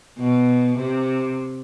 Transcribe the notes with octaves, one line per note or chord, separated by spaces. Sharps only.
B2
C3